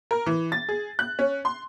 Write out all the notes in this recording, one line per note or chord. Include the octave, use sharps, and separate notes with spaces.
A#4
E3
A6
G#4
F#6
C#4
C6